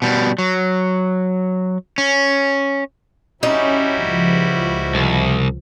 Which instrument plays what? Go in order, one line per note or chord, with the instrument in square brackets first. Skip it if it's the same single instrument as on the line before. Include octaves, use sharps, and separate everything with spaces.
[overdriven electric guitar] B2 G3
F#3
C#4
[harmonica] G3 E4 F#4 [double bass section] C#4 [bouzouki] D#4
[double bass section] C#2 F3
[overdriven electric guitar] C2